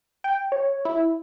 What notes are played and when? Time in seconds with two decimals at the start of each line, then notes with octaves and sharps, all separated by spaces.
0.24 G5
0.52 C#5
0.85 E4